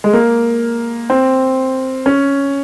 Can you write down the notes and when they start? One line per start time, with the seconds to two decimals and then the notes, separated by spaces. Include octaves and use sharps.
0.04 G#3
0.13 A#3
1.10 C4
2.06 C#4